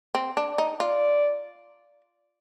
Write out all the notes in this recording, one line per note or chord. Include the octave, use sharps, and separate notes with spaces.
C4
D4
D5
D#4
F4 D5